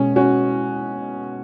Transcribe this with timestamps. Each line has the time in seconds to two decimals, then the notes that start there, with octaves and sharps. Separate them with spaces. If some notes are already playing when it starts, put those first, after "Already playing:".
Already playing: B2 G#3 C#4
0.16 C#4 F#4